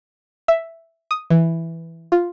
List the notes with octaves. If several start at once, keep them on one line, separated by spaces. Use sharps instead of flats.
E5
D#6
E3
F4